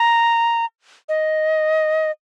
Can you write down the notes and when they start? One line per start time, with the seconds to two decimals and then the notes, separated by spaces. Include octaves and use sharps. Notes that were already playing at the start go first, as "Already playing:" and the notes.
Already playing: A#5
1.09 D#5